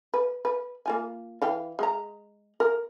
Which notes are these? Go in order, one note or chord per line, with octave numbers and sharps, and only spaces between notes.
B4
B4
A#3 F4 G#5
E3 F5 G5
G#3 A#5
A#4